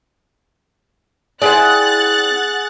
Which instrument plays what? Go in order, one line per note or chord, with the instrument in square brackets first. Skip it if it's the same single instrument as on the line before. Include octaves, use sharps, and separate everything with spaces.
[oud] C4 E4 D5 [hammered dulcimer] G#4 [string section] F#5 F#6 A6